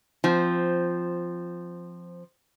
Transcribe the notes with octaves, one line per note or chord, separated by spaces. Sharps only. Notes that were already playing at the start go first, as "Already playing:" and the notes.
F3 C4